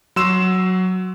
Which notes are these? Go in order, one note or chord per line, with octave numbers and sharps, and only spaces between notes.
F#3 C6 E6 E7